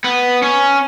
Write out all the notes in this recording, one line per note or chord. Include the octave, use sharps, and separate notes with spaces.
B3
C#4